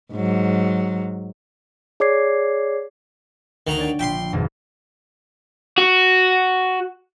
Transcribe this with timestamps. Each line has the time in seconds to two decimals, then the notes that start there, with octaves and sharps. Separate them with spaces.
0.13 G#2 F#3
2.00 G#4 C#5 D5 D6 G#6 C7
3.67 D2 D#3 A#5
3.78 C#5 D5 G5
3.99 A#1 G5 C6 B6
4.33 G#1 F2 B2
5.78 F#4